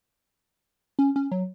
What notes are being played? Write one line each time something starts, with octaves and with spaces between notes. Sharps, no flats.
C#4
C#4
F#3